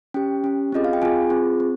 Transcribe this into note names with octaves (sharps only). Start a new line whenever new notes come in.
C#4 G4 G5
C#4 G4
C4 F4 G#4 D#5
F5
G5
C4 F4 G#4 G#5
C4 F4 G#4
C4